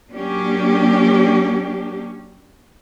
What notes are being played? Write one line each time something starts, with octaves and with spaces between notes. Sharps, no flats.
F#3 A#3 C#4 D4 G4